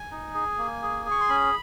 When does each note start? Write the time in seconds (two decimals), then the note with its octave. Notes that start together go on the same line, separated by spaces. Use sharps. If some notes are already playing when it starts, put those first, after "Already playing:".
Already playing: G#5
0.11 D#4
0.34 G#4
0.58 A#3
0.82 G#4
1.06 G#4
1.11 C#6
1.21 C6
1.29 C#4 B5